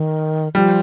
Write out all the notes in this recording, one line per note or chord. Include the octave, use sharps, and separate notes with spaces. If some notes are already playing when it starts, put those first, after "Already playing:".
Already playing: D#3
F3 G3